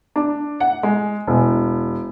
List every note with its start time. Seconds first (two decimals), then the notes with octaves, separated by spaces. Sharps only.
0.16 D4
0.60 F#5
0.83 G#3
1.27 E1